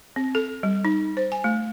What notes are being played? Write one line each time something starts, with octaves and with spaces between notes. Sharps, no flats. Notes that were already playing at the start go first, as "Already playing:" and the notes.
C4
A4
G3
D#4
C5
G#5
A3